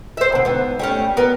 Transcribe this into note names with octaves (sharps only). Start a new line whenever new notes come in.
C5 E5
B2 D3
G#2 B3
G3 A3 C#4
B3 A#4